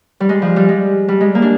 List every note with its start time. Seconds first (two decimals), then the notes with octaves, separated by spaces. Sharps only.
0.20 G3
0.29 G#3
0.42 F3
0.56 G3
0.69 G#3
1.08 G3
1.21 G#3
1.35 A#3
1.42 D4